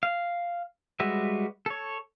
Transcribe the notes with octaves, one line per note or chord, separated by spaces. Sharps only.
F5
G3 G#3 F#4 B4 E5
A4 C#5